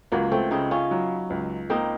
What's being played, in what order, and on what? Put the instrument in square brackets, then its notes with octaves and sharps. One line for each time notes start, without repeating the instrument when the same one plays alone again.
[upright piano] C#2 [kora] F#3 A#3
[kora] A3 C4
[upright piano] C#3 [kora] C4 D#4
[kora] C#4 F4
[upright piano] F#3
C#2
[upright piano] A#3 [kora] C4 D#4